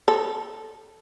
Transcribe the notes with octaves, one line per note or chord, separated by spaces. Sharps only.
A4